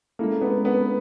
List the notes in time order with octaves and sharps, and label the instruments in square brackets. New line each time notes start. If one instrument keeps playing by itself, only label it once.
[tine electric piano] G#3 C#4 E4 A4 [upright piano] A#3
[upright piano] B3
B3